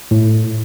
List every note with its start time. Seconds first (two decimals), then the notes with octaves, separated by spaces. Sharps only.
0.11 A2